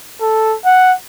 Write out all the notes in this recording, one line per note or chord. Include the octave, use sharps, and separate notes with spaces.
A4
F#5